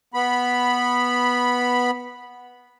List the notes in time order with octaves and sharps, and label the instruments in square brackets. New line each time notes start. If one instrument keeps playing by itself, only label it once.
[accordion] B3 B5